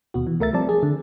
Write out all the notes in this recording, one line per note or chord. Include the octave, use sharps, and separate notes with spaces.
D#2 B2 F#4
E3
C#2 A3 A#4 E5 A6
F3 G3 A3 C4 D5 A5
G#4
D3